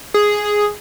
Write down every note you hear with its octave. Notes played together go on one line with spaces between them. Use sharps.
G#4